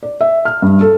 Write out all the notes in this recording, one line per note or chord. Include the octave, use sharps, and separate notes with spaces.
D5
E5
F6
G2
A4